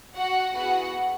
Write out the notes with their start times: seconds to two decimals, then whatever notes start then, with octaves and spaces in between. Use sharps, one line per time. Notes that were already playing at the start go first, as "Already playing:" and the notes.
0.16 F#4 F#5
0.53 B3 E4 F#4 G#4 F#5